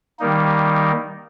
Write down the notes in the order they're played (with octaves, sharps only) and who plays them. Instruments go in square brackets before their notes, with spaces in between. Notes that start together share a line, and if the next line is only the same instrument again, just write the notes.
[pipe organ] D#3 G3 A#3 D#4